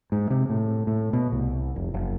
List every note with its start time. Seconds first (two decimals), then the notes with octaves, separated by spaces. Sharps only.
0.12 G#2
0.30 C3
0.50 A2
0.87 A2
1.13 B2
1.32 C2
1.76 F1
1.94 F#1